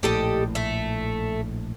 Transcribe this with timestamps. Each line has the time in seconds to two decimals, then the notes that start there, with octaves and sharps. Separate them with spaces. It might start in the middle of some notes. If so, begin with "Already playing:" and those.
0.03 A#1 A2 G4 A4 D#5
0.55 A3